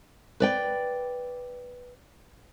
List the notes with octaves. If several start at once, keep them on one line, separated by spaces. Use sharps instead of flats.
B4 D5 G5